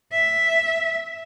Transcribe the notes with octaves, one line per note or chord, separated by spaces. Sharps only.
E5